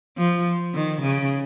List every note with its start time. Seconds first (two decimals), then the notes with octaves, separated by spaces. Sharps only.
0.17 F3
0.74 D#3
1.02 C#3